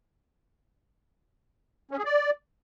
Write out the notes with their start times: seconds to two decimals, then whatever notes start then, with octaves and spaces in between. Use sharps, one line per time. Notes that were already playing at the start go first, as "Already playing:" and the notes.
1.91 C#4
1.98 G#4
2.05 D5